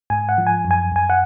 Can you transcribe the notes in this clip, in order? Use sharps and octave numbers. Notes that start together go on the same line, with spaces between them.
G#2 G#5
F#5
F3
G#5
F#2
G#5
F#2 G#5
F#5